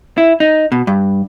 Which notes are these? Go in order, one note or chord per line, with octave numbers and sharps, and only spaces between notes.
E4
D#4
B2
G2